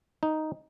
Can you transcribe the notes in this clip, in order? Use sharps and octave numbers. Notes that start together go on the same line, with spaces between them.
D#4